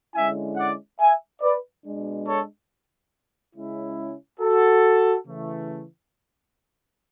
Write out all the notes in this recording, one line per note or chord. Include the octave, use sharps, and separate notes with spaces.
D3 G#3 C#4 E4 E5 G#5
D5 F#5
E5 G#5
B4 D5
B2 G#3 D4
A4 C#5
C#3 G#3 C#4 E4
F#4 A4
C#3 E3 A3